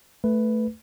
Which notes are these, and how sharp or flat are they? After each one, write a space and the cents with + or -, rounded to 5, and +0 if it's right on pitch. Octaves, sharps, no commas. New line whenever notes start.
A3 +0 B4 +0